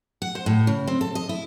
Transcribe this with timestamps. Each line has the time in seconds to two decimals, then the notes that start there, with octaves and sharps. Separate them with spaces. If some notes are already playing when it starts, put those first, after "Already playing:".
0.22 F#5
0.35 C5
0.46 A2
0.67 C#3
0.87 C4
1.01 A4
1.15 D#5
1.29 E4